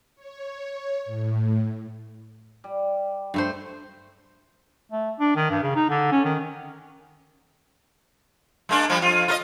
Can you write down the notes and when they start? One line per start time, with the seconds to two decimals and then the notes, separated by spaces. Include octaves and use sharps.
0.15 C#5
1.05 A2
2.64 G3
3.34 G2 A3 C5
4.92 A3
5.20 D4
5.36 D#3
5.50 G2
5.63 C#3
5.75 D#4
5.90 D3
6.12 C#4
6.25 D#3
8.69 G#3 A#3 D4
8.89 F3 G3
9.02 F2 F4
9.28 F4 A#4 D#5